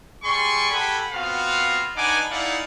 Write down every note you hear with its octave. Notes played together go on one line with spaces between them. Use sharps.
G3 G#4 D5 C6 C#6
G4 A4 F#5 G#5 B5
B3 C4 F4 F#4 F5
D4 D#4 B4 F#5 G#5 D6
D#4 E4 G#4 D5 F5 F#5